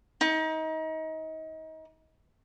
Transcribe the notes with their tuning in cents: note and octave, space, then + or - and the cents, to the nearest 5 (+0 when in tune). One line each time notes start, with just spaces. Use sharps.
D#4 +30